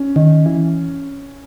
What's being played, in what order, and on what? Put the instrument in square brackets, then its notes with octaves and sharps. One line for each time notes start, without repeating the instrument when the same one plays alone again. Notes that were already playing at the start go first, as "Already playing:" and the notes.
Already playing: [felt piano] C#4
[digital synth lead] D#3
E3